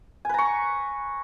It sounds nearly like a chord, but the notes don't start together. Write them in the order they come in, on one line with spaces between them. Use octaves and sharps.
G#5 B4 A#5 C#6